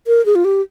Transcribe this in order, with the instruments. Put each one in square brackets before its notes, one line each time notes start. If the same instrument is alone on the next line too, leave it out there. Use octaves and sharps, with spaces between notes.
[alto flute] A#4
G#4
F4
G4